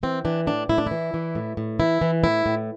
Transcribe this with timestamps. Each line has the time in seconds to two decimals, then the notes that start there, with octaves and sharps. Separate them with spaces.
0.03 E3 C4
0.25 E3 D4
0.47 A2 D4
0.69 A2 E4
0.78 D4
0.87 E3 E4
1.14 E3
1.35 A2
1.57 A2
1.80 E3 E4
2.01 E3
2.24 A2 E4
2.46 A2